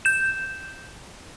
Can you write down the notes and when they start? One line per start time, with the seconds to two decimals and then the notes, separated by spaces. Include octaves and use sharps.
0.05 G6 E7